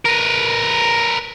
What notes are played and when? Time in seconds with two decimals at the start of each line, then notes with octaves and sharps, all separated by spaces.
0.06 A#4 B4